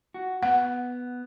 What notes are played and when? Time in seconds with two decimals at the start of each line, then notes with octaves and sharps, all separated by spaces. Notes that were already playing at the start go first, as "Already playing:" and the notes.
0.14 F#4
0.43 B3 F#5